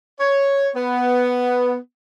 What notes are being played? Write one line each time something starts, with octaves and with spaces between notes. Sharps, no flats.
C#5
B3